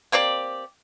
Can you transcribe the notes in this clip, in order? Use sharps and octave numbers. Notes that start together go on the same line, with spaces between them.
A#3 C4 G4 D5